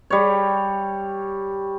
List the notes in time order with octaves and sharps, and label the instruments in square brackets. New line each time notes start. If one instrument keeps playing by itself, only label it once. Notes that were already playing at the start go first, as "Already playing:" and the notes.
[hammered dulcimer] G3 C#5